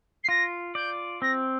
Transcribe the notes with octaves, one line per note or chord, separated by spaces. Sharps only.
C7
F4 A#6
D5 G6
C4 A#6